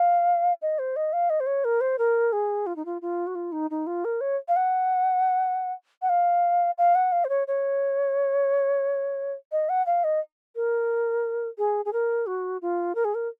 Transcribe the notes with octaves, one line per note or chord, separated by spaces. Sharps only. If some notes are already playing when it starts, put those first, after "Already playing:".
Already playing: F5
D#5
C5
D#5
F5
D#5
C5
C#5
A#4
C5
A#4
G#4
F4
D#4
F4
F4
F#4
F4
D#4
D#4
F4
A#4
C#5
F5
F#5
F#5
F5
F5
F#5
F5
C5
C#5
C#5
D#5
F#5
F5
D#5
A#4
G#4
G#4
A#4
F#4
F4
A#4
G#4
A#4